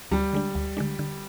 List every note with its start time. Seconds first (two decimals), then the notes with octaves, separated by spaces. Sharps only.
0.11 D2 G3
0.33 D3 G#3 D4
0.55 D2
0.77 D3 G#3 D4
0.99 D3